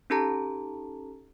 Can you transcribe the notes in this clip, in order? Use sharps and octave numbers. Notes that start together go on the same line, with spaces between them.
C#4 D#4 G4 A4 A5 A#5